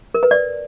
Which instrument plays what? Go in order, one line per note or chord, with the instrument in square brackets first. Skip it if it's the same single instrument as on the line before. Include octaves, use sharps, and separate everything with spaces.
[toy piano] A#4
B4
D5